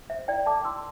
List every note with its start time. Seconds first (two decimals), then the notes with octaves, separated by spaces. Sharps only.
0.10 C5 E5
0.28 E4 D5 G5
0.46 A4 A5 D6
0.65 E4 C6 E6